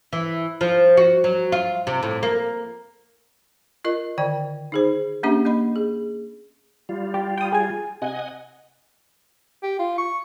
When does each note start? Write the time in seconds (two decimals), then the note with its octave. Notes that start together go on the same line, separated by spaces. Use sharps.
0.13 E3
0.61 F3
0.97 F#4
1.24 F#3
1.52 F4
1.87 C3
2.03 A2
2.23 A#3
3.85 F4 A#4 D#5
4.18 D3 D#3 D5 G5
4.72 D#4 G#4 C5
5.23 A#3 C#4 D4 G4 E5
5.45 A#3 D#5 B5
5.76 G#4
6.89 G3 F4
7.14 G4
7.38 G5 D#6
7.52 G#4 G#5
8.02 C3 D#5 F#5 G#5
9.63 G4
9.79 F4
9.98 C#6